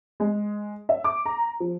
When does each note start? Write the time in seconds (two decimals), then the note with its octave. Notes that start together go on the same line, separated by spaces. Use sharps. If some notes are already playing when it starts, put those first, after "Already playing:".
0.20 G#3
0.89 E5
1.04 D6
1.26 A#5
1.60 F3